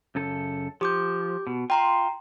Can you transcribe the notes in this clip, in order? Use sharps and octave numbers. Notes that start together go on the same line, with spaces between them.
F#2 C#3 A4
F3 G4 D6 G6
B2
F4 G5 A#5 C6